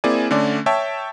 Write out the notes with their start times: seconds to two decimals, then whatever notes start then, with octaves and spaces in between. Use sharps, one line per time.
0.04 A#3 C4 E4 G#4 D5 G#5
0.31 D3 A3 C#4 D5
0.66 C#5 E5 G5 A5